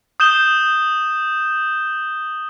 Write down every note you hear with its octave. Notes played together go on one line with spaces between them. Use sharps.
D#6 G6 E7 G7